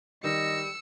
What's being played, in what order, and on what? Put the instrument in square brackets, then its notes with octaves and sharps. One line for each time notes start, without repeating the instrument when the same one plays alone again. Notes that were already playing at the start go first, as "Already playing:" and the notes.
[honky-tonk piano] D#3 [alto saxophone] G3 [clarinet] D#5 [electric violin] E6 C#7